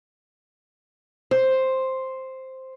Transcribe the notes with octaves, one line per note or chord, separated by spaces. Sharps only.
C5